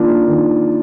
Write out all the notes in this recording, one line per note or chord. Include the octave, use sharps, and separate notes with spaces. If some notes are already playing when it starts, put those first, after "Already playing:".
Already playing: D#3 A#3 D4 F4
D#3